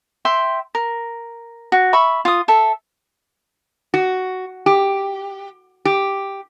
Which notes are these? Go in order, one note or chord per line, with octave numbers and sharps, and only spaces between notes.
E5 G5 C6
A#4
F#4
E5 B5 C#6
F4 D#6
A4 E5
F#4
G4
G4